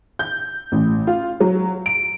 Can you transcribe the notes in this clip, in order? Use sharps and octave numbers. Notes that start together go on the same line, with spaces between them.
G6
A1
F4
F#3
D7